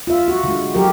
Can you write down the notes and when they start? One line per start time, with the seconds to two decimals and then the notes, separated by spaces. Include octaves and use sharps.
0.07 F4 E5
0.28 F#4
0.44 D3 G#3
0.74 F#3 G4 G#4 A#4